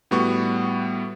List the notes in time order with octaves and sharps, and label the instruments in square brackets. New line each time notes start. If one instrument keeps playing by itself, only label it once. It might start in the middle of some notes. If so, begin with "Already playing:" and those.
[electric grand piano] A2 G3 B3 F#4 C#6